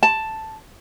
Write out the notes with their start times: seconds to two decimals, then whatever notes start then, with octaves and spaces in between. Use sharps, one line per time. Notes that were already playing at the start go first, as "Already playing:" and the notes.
0.03 A5